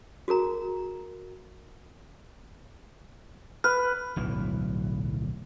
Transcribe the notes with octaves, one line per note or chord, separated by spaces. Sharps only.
F#4 G#4 A#4 A#5
B4 F6
D1 B1 E3